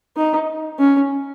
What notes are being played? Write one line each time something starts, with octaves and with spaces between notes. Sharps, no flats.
D#4
C#4